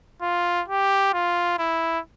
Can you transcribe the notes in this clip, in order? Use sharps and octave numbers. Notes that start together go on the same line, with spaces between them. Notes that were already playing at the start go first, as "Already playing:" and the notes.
F4
G4
F4
E4